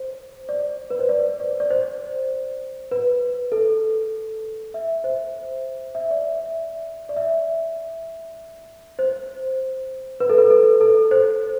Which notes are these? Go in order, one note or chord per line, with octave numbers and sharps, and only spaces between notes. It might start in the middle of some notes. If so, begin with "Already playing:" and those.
Already playing: C5
D5
B4
C5
D5
D5
D5
C5
B4
A4
E5
C5
E5
D5
E5
D5
E5
C5
B4
A4
B4
A4
A4
C5